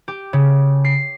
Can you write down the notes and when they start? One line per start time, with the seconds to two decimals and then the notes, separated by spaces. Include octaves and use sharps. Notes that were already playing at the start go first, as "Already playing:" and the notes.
0.08 G4
0.33 C#3
0.85 C7